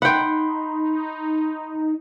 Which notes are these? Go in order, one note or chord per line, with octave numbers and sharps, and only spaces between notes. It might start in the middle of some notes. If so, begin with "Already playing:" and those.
D#4 F#5 G5 B5 C6